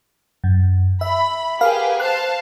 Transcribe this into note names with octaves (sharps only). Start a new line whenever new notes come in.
F#2
E5 B5
G4 G#4 A#4 B4 F5 F#5
C5 F5 A5 F#6